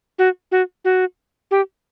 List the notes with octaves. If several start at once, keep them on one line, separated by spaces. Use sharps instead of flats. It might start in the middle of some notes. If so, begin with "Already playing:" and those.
F#4
F#4
F#4
G4